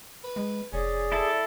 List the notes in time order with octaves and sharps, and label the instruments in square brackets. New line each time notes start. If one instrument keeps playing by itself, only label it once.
[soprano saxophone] B4
[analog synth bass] G#3
[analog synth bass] F1 [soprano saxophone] C#4 [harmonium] G#4 D5
[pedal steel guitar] E4 A4
[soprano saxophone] D5